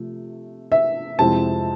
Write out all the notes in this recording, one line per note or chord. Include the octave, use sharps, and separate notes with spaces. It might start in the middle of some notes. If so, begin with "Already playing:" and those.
Already playing: C3 F3 A3
E5
F2 C3 G#3 C4 E4 A5